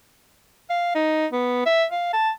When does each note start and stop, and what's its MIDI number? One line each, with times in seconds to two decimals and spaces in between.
0.70 0.90 77
0.95 1.27 63
1.32 1.65 59
1.66 1.85 76
1.92 2.11 77
2.13 2.30 81